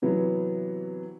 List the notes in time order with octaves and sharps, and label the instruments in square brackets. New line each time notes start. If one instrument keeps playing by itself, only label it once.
[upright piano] C3 E3 F#3 B3